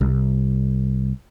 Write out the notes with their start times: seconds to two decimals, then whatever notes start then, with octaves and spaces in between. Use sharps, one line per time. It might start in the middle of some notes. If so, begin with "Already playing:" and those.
0.01 C2